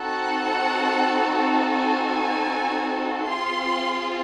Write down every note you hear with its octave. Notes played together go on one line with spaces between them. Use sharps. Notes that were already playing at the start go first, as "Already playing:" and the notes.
Already playing: C4 D#4 F#4 A4 F#5
G#5
C4 F4 G#4 C6